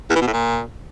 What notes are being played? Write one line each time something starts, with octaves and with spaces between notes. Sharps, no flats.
E2
E3
B2
A2
A#2